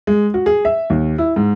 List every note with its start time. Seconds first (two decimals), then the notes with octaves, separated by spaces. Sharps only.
0.07 G#3
0.34 F#4
0.46 G#4
0.65 E5
0.90 D#2
1.18 E4
1.36 G#2